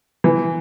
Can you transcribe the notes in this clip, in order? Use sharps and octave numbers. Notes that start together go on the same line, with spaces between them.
E3